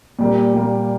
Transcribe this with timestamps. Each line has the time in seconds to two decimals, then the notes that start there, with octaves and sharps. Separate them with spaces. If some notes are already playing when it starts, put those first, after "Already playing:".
0.19 A#2 G3 A#3
0.54 A#2 G3 A#3